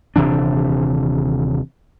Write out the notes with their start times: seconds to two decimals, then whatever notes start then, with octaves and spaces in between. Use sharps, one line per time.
0.16 D#1 C3 E3 D4